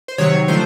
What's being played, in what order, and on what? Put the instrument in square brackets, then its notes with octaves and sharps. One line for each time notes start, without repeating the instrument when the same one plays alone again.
[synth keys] C5
C3 D#3 F#3 C#5
D3 F3 A3 C5